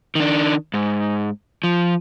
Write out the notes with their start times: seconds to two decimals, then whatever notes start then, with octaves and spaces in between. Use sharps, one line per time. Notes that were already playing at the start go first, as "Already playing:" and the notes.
0.15 D#3 D4
0.74 G#2
1.64 F3